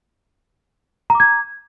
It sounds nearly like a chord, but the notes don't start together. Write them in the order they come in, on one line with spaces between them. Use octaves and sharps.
A#5 D6 G#6